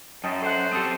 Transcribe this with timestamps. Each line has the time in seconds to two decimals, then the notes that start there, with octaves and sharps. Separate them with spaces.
0.24 F#2 D#5 G5 A5
0.42 A4 C5 F#5
0.73 C4 G4 A4 A5 D#6